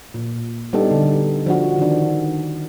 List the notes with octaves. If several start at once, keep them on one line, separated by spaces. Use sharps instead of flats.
A#2
G3 B3 D4 D#4 G4 A4
D3
F3 D4 F#4
D#3 D4